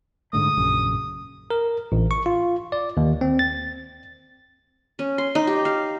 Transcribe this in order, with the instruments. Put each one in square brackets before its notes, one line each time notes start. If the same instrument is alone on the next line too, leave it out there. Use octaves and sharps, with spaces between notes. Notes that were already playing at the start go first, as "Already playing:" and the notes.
[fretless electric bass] G#2 D3 A3 [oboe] D#6
[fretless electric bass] A#1 F#2 C#3
[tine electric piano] A#4
A1
C#6
F4
D5
D#2
C4
A6
[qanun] C#4
C6
D#4
G4
F5